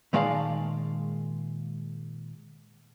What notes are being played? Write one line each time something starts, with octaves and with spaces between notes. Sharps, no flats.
A#2 D#3 G#3 D5 F5 A5